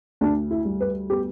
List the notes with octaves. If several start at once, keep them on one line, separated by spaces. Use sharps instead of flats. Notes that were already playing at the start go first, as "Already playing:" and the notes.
D2 D4
E4
G3
B4
B3 G4